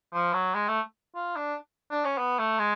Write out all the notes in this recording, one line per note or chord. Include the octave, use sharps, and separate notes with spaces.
F3
F#3
G#3
A3
F4
D4
D4
C#4
B3
A3
G#3